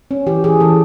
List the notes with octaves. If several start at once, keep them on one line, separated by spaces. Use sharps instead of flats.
C#4
E3 G4
E3 G#4
E3 A4